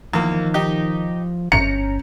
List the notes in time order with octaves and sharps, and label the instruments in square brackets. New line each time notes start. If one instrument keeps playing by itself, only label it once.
[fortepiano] E2 A#3 [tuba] D#3 [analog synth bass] F3
[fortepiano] D#4 G4
[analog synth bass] G1 [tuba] C#4 [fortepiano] A#5 [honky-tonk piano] C#7